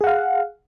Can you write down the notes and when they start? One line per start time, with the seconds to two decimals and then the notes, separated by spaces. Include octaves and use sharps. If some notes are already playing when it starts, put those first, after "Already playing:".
0.01 G#4
0.04 F#5
0.07 F5